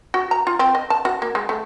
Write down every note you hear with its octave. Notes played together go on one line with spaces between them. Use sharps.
F#4
A#5
F4
C4
D#5
A5
F#4
A#3
G#3
A3